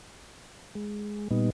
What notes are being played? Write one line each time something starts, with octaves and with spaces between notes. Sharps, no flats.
G#3
A#2 G3 B3 D#4